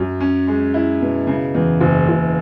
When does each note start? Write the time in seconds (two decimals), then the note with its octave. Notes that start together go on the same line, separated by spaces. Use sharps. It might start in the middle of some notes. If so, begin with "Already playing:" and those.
Already playing: F#2
0.20 C#4
0.47 G#3
0.74 E4
1.01 B2
1.27 C#3
1.55 E2
1.80 F#1
2.08 F#1